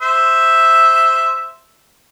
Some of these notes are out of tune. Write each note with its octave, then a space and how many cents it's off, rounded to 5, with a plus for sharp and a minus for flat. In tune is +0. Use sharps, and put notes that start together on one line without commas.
C5 +0 E5 +0